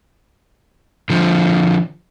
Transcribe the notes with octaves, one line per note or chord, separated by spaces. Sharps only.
D3 F3